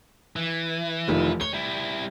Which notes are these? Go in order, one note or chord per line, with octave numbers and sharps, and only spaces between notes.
E3
F1 D#3 F3
C#5 G7
G3 E4